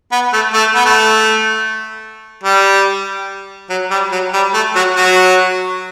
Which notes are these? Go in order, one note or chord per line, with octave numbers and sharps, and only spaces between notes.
B3
A3
A3
B3
A3
G3
F#3
G3
F#3
G3
A3
F#3 F#4
F#3 F#4